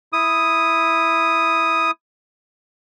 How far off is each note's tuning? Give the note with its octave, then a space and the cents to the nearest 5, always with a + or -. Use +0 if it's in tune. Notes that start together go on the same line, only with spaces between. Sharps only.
E4 +0 D#6 +0